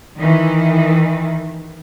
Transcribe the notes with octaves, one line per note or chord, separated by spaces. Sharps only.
D#3 E3